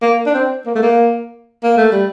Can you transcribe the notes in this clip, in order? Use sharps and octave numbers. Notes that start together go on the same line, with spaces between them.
A#3
D4
C4
A#3
A3
A#3
A#3
A3
G3